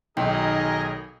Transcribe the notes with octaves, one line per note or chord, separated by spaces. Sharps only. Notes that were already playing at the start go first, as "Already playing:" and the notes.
B1 D#3 G#4 A#4 D#5 G5